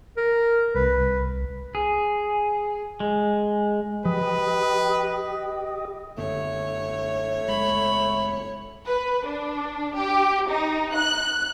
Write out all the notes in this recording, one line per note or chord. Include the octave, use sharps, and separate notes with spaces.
A#4
C2 B4
G#4
G#3
F3 G4 B4 D#5
F#2 D3 A3 B3 C#5
F#1 G#3 B5
B4
D4
G4
D#4
F#6